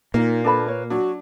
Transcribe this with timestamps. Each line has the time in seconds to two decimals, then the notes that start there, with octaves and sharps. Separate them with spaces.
0.14 A#2 A#3 D#4
0.44 D4 A4 B4 B5
0.68 C#5
0.90 F#3 D4 F#4